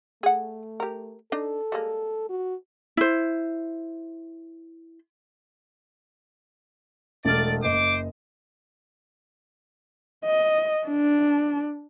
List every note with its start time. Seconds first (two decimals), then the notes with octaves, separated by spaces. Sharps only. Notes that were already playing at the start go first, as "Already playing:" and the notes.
0.23 A3 G#4 F#5
0.80 G4 A#4
1.32 D4 D#4 A4
1.72 G3 G#3 A#3
2.29 F#4
2.97 E4 C5
7.25 E1 A3 D5 F6
7.63 F#1 C5 D#5 D6
10.25 D#5
10.87 D4